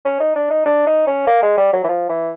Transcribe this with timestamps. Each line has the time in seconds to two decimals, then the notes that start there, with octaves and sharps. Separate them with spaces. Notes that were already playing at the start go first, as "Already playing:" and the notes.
0.05 C#4
0.20 D#4
0.36 D4
0.50 D#4
0.66 D4
0.87 D#4
1.07 C#4
1.27 A#3
1.43 G#3
1.58 G3
1.73 F#3
1.84 E3
1.89 F3
2.10 E3